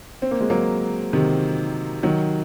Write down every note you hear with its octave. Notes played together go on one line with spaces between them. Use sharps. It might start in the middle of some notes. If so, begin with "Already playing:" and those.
C4
A#3
G#3
F#3 A#3
C3 D#3
D#3 F#3